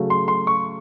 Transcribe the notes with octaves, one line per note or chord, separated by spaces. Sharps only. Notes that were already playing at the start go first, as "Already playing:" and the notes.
Already playing: C#3 F#3 A3
C6
C6
C#6